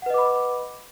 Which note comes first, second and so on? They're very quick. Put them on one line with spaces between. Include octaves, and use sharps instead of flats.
F#5 B4 D#5 D6 B5